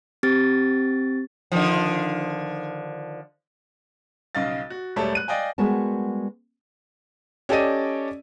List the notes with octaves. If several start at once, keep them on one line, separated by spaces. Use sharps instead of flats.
C4 G4 A6
D3 D#3 F3
B1 C#3 D#5 F5 A6
F#4
E1 G3 A3 C#5 D5 A5
F#6 D#7
D5 D#5 F5 G5 G#5
G3 G#3 B3 F#4 A#4 A5
C#4 G4 A4 D5 D#5 D#7